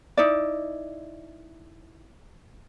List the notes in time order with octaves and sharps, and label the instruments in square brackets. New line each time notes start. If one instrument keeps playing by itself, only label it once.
[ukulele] D#4 E4 D5